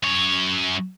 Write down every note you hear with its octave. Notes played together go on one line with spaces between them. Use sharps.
F#2 C#5